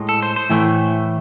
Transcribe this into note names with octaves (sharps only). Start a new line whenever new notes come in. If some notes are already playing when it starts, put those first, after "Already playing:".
Already playing: A2 G#3
A4
C5
C5
A2 E3 A3